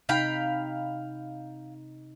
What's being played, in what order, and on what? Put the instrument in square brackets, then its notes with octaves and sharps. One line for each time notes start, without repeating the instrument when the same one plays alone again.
[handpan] C3 D#4 [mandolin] F5 G5 B5